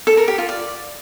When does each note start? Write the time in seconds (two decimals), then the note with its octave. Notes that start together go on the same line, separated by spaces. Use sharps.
0.07 A4
0.17 A#4
0.28 G4
0.38 F4
0.49 D5